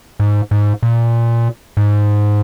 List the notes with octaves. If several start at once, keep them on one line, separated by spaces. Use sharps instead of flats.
G#2
G#2
A#2
G#2